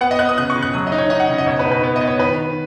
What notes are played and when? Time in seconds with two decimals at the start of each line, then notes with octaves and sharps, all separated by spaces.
0.01 B3 F#5
0.11 D#5
0.19 B3 F#6
0.29 D#6
0.38 C#3 F#6
0.50 C#6
0.56 C#3
0.62 F#6
0.74 F#3 D#6
0.87 D#5
0.92 D#4
0.98 C#5
1.10 D#4 D#5
1.20 F#5
1.29 C#3
1.38 D#5
1.46 B2 C#5
1.59 B4
1.65 D#4
1.71 B4
1.84 B3
1.96 D#5
2.01 B3
2.07 C#5
2.19 D#3 B4
2.37 D#3